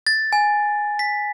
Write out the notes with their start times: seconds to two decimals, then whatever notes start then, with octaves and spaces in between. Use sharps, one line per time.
0.07 A6
0.33 G#5
0.99 B6